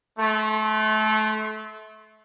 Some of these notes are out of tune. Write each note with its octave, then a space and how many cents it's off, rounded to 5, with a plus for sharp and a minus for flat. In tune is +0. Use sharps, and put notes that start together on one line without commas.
A3 -25 C6 +0